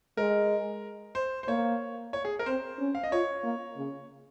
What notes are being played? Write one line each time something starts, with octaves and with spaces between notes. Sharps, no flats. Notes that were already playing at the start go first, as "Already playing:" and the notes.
G#3 A#4
C5
C5
A#3 C#5
C#5
G#4
A#4
C4 C5
C#4
F5
D#5
F4 C#5
A#3
C#3